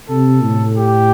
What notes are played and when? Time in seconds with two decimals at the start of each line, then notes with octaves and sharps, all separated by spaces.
0.09 C3 A4
0.44 A2
0.77 G4